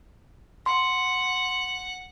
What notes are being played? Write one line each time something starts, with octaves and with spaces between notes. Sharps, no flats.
F#5 C6